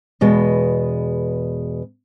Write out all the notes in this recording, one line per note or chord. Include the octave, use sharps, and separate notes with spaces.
E2 B2 G#3